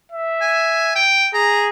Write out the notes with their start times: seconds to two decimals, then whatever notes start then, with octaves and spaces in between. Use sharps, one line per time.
0.12 E5
0.41 G#5
0.96 G5
1.34 G#4 A#5